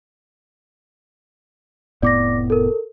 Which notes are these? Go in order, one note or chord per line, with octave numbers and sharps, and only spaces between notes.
F1 A2 B3 D5 D6 A#6
A4 A#4